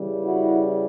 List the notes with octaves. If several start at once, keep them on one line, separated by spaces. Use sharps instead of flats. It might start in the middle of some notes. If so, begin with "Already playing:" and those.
Already playing: C#3 E3 G3
E4 F#4